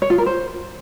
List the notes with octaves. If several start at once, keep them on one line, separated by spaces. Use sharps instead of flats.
C#5
F4
A#4
C5